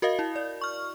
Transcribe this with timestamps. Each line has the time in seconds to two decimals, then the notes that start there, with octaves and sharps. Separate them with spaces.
0.02 F#4 A#4 D#5 F5
0.19 E4
0.36 D5
0.61 C#6 F6